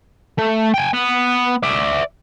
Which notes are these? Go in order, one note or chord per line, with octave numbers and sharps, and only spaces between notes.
A3
G5 G#5
B3
D5 E5